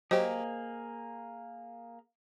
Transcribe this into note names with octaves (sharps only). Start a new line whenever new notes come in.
F#3 A#3 G4 G#4 C5 D#5